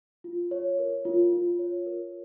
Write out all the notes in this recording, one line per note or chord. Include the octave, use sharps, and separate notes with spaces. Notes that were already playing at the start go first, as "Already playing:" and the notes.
F4
C#5
A#4
F4
F4
C#5
A#4